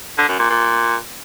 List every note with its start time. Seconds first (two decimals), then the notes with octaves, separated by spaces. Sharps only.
0.18 D3
0.29 F#2
0.39 A#2
0.50 A#2